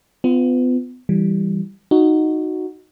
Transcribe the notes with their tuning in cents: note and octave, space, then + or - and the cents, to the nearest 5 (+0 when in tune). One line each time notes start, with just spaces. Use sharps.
B3 +35 F4 +0
E3 +0 G3 +0
D#4 +0 F#4 +0